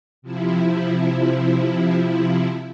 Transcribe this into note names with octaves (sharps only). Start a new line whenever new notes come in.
C3 F3 E4